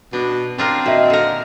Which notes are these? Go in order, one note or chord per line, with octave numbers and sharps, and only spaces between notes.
B2 D4
C4 D4 F4 A#4
A#2 D#3 F#4 E5
D3 A#4